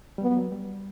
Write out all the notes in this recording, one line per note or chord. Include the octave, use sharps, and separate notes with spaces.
G3
F#3 B3
F#3
G3